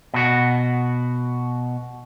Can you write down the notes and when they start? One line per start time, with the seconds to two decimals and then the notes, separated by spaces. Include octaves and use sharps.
0.14 B2 F#4